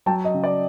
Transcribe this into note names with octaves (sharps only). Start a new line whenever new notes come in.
F#3 G5 A5
D#5
C#3
D5